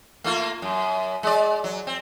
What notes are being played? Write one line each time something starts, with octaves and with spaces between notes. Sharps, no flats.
A3 A#3 F4
F#2
G#3 D5
F#3
C4